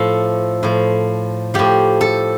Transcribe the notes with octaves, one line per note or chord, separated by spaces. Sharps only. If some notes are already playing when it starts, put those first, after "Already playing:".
Already playing: A2 F3 A4
A2 F3
A2 F3 G4
A4